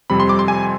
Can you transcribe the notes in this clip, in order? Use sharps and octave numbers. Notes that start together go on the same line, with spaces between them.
F2 C3 G3 C4 B5
C6
D6
C6
G#5